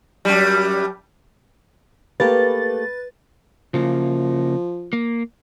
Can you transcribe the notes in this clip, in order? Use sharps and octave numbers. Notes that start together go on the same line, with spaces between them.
F#2 G3
A3 A#3 G4 B4 A6
C#3 F3 A#3
A#3